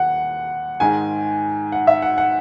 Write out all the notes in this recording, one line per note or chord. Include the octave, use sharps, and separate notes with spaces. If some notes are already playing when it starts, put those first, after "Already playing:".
Already playing: D#2 F#5
G#2 D#3 G#3 G#5
F#5
E5
F#5
F#5